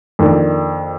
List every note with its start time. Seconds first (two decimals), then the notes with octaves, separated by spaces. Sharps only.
0.19 F2 D#3 A#3 D4